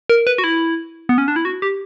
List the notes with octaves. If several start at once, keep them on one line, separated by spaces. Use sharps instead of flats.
A#4
B4
F#4
E4
B3
C#4
D4
E4
F#4
G4